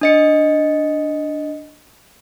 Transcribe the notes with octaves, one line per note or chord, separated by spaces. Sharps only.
D4 D#5 C#7